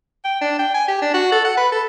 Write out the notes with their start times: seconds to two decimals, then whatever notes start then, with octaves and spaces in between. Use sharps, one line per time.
0.24 G5
0.41 D4
0.59 G5
0.74 G#5
0.88 G4
1.02 D4
1.14 F#4
1.32 A4
1.45 F#5
1.57 B4
1.72 A4